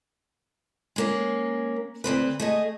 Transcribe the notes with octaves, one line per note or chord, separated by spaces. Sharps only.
G#3 A#3 C#4
D2 B2 C4 B4
A3 G#4 D#5